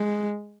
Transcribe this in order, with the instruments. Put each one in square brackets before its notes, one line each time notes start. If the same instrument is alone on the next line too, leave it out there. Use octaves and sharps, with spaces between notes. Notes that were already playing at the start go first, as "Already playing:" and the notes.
Already playing: [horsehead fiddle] G#3